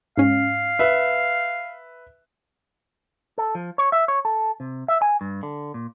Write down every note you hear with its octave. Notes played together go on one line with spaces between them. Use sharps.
G#2 C#4 F5
B4 E5
A4
F3
C#5
E5
C#5
A4
C3
E5
G#5
G2
D3
A#2